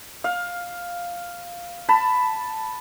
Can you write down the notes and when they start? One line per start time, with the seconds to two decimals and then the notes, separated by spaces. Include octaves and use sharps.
0.24 F5
1.89 A5 B5